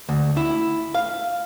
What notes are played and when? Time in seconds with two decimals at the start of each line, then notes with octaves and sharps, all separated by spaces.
0.09 D2
0.37 E4
0.94 F5